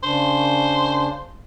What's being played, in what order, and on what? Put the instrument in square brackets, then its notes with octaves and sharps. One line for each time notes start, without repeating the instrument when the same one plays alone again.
[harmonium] C#3 D4 [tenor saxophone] C5